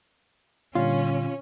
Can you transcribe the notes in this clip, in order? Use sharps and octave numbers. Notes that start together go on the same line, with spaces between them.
A#2 D3 G3 C#4 F4